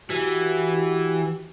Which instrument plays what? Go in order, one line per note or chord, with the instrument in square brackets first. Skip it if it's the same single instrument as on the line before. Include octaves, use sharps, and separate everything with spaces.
[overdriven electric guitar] E3 [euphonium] F#4 [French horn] G4